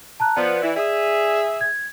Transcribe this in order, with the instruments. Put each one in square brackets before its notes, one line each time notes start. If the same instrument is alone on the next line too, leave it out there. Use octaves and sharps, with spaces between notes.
[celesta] A5 A#5 F#6
[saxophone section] F3 B3 [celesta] D5
[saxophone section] E3 E4
G#4 E5
[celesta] G#6